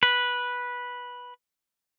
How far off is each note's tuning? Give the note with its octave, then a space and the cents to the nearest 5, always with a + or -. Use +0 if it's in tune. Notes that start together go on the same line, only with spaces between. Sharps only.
B4 -10